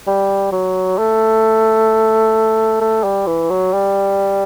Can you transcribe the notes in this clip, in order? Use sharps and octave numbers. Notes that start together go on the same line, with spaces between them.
G3
F#3
A3
A3
G3
E3
F#3
G3